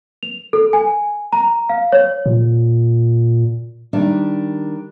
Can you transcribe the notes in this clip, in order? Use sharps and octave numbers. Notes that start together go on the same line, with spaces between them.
F7
A4
G#5
A#5
F5
C#5
A#2
D#3 G3 D4